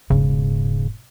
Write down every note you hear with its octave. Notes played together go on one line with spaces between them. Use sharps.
E1 G#2 C#3